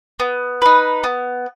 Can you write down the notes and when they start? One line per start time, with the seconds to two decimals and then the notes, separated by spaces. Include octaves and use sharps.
0.20 B3
0.62 D#4 B4
1.04 B3